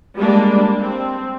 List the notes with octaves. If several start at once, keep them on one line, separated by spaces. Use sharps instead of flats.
G3 G#3 A#3 D4
C4